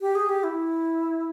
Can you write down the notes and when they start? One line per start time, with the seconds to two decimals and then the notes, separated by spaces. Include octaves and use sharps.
0.01 G4
0.15 G#4
0.29 G4
0.43 E4